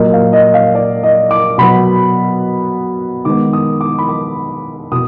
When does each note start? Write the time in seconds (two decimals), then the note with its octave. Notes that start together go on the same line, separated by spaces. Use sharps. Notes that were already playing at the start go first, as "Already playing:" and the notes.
Already playing: A#2 F#3 A#3 D#5
0.13 F5
0.33 D#5
0.54 F5
0.75 D5
1.04 D#5
1.31 D6
1.58 B2 F#3 B3 B5
3.25 D#3 G#3 B3 D6
3.53 D#6
3.81 D6
3.99 B5
4.09 D6
4.92 B2 D#6